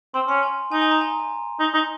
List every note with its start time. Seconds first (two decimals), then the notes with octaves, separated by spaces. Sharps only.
0.14 C4 C6
0.28 C#4 C6
0.43 G#5
0.72 D#4 G#5
0.82 G#5
0.91 A#5
1.01 G#5
1.10 A#5
1.20 G#5
1.60 D#4
1.74 D#4